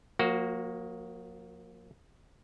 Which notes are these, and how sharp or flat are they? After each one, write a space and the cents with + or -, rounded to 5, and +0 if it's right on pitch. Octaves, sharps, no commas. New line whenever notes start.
F3 +45 A#3 +0 F#4 +0